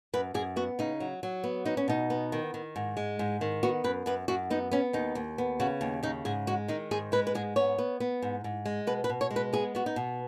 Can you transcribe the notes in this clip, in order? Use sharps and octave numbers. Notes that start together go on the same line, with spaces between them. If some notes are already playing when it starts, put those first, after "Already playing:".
F#2 B4
F#2 G#4
B3 F#4
C#3 D#4
F#3
F#3
B3
B3 D#4
C#4
B2 D#4
B3
D#3
D#3
G#2
G#3
G#2
D#3
B3 F#4
F#2 B4
F#2 B4
F#2 F#4
B3 D#4
B3 C#4
D#2 D#4
D#2
B3
C#3 F#4
D#2
C#3 D#4
G#2 G#4
G#3 F#4
D#3 D#4
G#2 G#4
G#3 B4
B4
G#2 G#4
B3 C#5
B3
B3
G#2
G#2
G#3
B2 B4
B4
B2
C#5
G#3
B4
B3 G#4
B3 F#4
D#4
B2